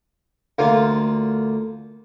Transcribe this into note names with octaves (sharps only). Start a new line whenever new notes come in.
D2 A#3 F4